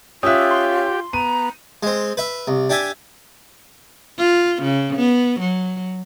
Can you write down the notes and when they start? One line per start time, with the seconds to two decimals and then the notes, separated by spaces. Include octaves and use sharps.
0.23 C#4 F4 G4 E5 D#6 E6 F#6
0.51 C6
1.13 B3 A#5 D#7
1.83 G#3 C4
2.17 B4 E5
2.48 C2
2.70 D4 G4 E5 G#5
4.18 F4
4.62 C#3
4.96 B3
5.40 F#3